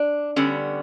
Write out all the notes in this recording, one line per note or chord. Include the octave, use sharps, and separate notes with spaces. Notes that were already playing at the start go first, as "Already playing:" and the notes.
Already playing: D4
D3 G3 B3 C#4